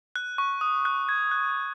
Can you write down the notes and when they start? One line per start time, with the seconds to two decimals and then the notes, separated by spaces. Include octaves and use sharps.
0.16 F#6
0.38 C#6
0.61 D#6
0.85 F#6
1.09 G#6
1.31 F#6